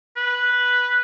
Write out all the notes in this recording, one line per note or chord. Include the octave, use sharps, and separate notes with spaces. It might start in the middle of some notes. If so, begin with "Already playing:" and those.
B4